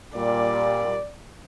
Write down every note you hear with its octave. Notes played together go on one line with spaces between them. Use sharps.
A#2 G3 D5